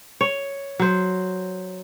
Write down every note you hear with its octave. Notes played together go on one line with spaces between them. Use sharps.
C#5
F#3 C5